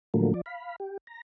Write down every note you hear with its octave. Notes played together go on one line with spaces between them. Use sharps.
A2 D3 F3 F#3 A3 A#3
F3 D5
F5 B5
G4
A#5